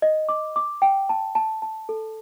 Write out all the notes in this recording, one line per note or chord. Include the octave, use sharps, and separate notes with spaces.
D#5
D6
D6
G5
A5
A5
A5
A4